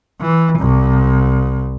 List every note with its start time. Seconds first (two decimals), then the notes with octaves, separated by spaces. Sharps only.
0.21 E3
0.59 C2